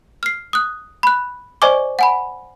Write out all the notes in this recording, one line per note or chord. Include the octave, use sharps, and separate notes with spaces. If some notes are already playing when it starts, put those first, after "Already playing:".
F6 C7
D#6 F#6
B5 F#6
C5 D5 D#5 G#5 C#6 D6
F#5 G#5 B5